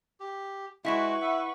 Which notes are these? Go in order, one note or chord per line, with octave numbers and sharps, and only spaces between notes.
G4
G#3 E4 F#4 B4 F5 C#6 B6 E7
E5 F#5